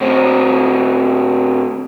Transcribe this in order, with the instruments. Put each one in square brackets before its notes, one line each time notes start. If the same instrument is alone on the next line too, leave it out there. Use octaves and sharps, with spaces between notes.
[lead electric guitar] A2 C4